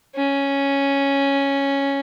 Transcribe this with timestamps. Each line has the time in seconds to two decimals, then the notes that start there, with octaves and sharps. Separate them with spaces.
0.16 C#4